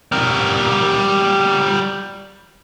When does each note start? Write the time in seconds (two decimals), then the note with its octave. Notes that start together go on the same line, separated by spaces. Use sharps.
0.12 G3 A#4